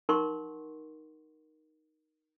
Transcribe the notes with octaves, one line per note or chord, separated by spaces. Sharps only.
D#4 A#4 F#5 C6 C#6